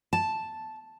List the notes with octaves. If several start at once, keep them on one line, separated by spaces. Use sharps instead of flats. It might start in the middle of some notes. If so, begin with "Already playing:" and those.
A5